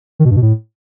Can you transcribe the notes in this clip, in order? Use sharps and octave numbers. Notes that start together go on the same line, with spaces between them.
D#3
B2
G2
B2
A2